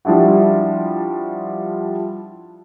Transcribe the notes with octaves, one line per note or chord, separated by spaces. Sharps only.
F3 G3 D4 E4 F#4